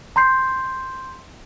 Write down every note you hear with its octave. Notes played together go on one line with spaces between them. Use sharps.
A#5 C6 G6 C7